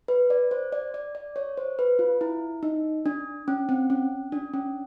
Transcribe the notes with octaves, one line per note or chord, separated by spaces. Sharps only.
B4
D5
C5
D5
D5
D5
C#5
C5
B4
F4
E4
D#4
D4
C#4
C4
C#4
D4
C#4